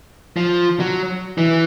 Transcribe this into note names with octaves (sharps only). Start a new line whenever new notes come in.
F3
F#3
E3